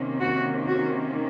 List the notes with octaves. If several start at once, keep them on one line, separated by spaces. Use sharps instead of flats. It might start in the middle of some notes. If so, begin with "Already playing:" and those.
Already playing: C3 D#3 A#3 C#4
F#4
F#4